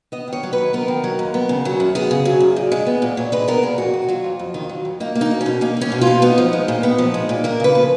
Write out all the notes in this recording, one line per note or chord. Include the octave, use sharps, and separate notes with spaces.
B3 D#5
D#3
C#5
F#3
B4
D#2
B3 A#4
D#3
F#3
D#2
B3
C#3
F#3
F#2
B3 G#4
C#3
F#3
F#2
A#2
G#3
B3
A#2
A#2 C#5
G#3 B4
B3 A#4
A#2 G#4
F2 F#4
D#3
F#3 F4
F2
F2
D#3
F#3
F2
A#3 D#4
A#3
D#4
B2
C#4
B2
A#3 D#4
A#3 C#4
B2
F4
B2
B3 D#4
F3
G#3
A#2
B3
F3
G#3
A#2
A#3 A#4
C#3 B4
F3